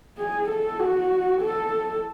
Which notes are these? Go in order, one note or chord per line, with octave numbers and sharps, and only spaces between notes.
G#4
A4
F#4
A4